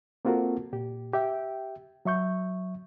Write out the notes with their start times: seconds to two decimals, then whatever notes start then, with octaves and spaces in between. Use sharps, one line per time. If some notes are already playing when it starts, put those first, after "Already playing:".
0.25 A#3 C4 F4 F#4 A4 A#4
0.73 A#2 G4
1.14 G4 E5 G5
2.05 F#3 E5 C#6 G6